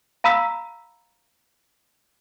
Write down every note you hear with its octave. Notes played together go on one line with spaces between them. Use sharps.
F5 A#5 B5 E6 B6